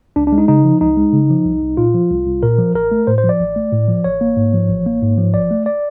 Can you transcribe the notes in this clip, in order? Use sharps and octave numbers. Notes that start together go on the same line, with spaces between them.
C#2 D4
D4
G#3
D#4
C#3 D#4
F3
C#2 D#4
G#3
C#3
F3
C2
C2
A#2 F4
F3
C2
C2
A#2 A#4
F3
A1 A#4
A3
A2 C5
C5
F3
D5
A1
A3
A2
F3
A1 C#5
A#3
G#2
F3
A1
A#3
G#2
F3
A1 D5
A3
D5